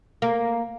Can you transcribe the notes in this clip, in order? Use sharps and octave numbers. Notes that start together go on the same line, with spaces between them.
A#3